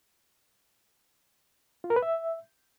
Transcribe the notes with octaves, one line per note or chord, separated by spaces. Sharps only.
F4
A#4
B4
E5